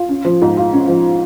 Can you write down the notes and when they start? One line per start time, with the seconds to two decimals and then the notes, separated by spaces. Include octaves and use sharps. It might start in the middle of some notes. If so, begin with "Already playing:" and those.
Already playing: F4
0.09 C#4
0.25 F3
0.42 G#2
0.57 F4
0.73 C#4
0.88 F3